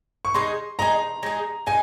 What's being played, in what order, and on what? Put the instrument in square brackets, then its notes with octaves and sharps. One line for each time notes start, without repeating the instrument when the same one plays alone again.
[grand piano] C#6
[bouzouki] G#3 D#4 G#4 [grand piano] C6
[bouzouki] G#3 D#4 G#4 [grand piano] A#5
[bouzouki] G#3 D#4 G#4
[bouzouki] G#3 D#4 G#4 [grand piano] G#5